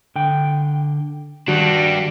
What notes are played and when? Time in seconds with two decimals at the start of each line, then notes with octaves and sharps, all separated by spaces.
0.16 D3 G5
1.48 D#3 G3 D4 F#4